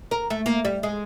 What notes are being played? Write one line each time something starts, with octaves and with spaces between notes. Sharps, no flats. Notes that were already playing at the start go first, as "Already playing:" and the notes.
A#4
A3
A#3
G3
G#3